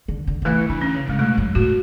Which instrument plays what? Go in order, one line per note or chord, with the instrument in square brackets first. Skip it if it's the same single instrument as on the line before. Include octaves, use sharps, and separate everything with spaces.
[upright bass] D3
D3
D3
[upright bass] E3 [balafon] A3
[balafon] E4
[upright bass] D3 [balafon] D4
[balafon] C#4
[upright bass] C#3
[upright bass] C#3 [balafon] G#3
[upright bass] B2 [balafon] A3
[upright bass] F#2
[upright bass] A2 [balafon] F#4